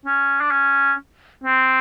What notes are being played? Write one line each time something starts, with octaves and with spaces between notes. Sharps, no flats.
C#4
D4
C#4
C4